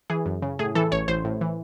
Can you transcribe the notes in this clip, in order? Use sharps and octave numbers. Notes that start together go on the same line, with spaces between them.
E3 G#4
F#2
C#3
A2 G#4
E3 A4
A1 C#5
A1 C5
A2
E3